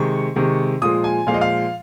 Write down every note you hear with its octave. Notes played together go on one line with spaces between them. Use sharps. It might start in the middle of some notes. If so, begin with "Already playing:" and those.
Already playing: C3 D#3 G#3 C#6
C3 D#3 G#3
A#2 F3 G#3 D#6
G#5
A#2 F3 G#3 F5
D#5
F5